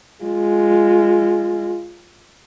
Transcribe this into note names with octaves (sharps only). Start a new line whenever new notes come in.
G#3 F4